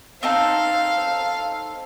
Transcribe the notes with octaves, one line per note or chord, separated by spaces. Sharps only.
C4 D#4 A4 F5